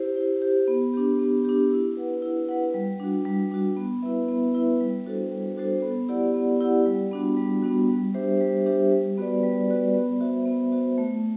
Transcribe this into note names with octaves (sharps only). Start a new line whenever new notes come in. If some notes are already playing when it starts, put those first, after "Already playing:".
Already playing: E4 G4 C5
E4
G4 C5
B3
D4 G4
B3
D4 G4
E4
B4 F#5
E4
B4 F#5
G3
D4 F#4
G3
D4 F#4
B3
E4 B4 E5
B3
E4 B4 E5
G3
D4 F#4 A4 C5
G3
D4 F#4 A4 C5
B3
E4 G4 D5 F#5
B3
E4 G4 D5 F#5
G3
B3 D4 F#4
G3
B3 D4 F#4
G3
D4 G4 C5 E5
G3
D4 G4 C5 E5
G3
B3 F#4 B4 D5
G3
B3 F#4 B4 D5
B3
F#4 C5 E5
B3
F#4 C5 E5
A3